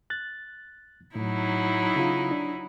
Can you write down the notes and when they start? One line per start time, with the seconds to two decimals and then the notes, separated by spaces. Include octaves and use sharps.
0.10 F#6 A6
1.15 A2 F#3 D#4 E4
1.96 C#3 F4
2.31 D4